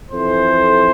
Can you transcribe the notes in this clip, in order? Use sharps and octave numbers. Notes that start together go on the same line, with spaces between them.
F2 E3 A4 C5